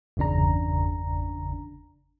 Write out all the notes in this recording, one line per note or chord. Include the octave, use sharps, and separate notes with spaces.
G1 E2 C#3 D4 A#5